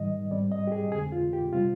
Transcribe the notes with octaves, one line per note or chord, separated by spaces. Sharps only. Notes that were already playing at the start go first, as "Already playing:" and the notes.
Already playing: G#2 D#3 G3 D#5
G#2 G3 C4 D5
D#5
G4
G#4
F2 D3 G#3 C4 G#4
F4
G4
C3 G3 C4 F4